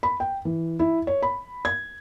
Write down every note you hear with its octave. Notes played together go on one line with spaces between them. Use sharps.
B5
G5
E3
E4
C#5
B5
G#6